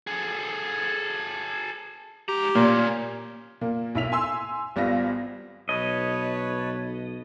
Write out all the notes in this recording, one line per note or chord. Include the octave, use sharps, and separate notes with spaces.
G#4 A4
G#2 G4 A#5
A#2 A#3 C#4
A#2 A#3
B1 E4 B6 F7
G#5 C6 E6
G#1 G3 B3 F4 A#6
B1 B4 C#5 D#5 A5